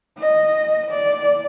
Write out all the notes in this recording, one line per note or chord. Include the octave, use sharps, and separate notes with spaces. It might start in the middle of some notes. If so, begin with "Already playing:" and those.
D#5
D5